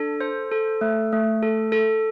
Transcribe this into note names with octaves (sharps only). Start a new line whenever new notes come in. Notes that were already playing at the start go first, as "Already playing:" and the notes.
Already playing: D4 A4
C5
A4
A3
A3
A4
A4